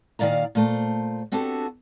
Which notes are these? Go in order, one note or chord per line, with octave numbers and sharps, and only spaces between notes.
A#2 D#3 F3 D5 F5 A#5
A#2 A3 C5
B3 C4 D4 F#4 G4 A4